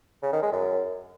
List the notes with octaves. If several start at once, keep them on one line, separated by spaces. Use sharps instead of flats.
C#3
D#3
G#3
F#2